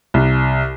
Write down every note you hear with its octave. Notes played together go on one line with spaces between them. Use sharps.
C2